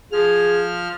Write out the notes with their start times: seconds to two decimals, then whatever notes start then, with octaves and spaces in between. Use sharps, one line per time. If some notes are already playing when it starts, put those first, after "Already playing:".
0.12 F3 G#4 F6